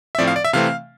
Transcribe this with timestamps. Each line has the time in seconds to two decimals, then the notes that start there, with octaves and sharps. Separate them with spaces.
0.15 E5
0.18 A2 F3 C4 D5
0.27 F5
0.36 D5
0.45 E5
0.53 C3 E3 A3 C4 F5